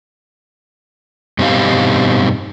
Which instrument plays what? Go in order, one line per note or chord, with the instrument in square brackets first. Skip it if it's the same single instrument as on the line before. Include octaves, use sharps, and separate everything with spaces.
[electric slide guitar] G2 B2 C4 D#4 G4 F5